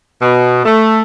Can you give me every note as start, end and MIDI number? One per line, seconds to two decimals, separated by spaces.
0.21 0.64 47
0.66 1.02 57